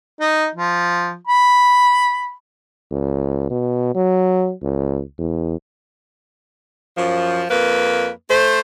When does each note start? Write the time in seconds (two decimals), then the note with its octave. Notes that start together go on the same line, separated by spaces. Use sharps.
0.20 D#4
0.55 F3
1.27 B5
2.91 C#2
3.50 B2
3.95 F#3
4.63 C#2
5.18 E2
6.97 F#2 F3
7.50 F2 A#3 B4
8.29 A3 C5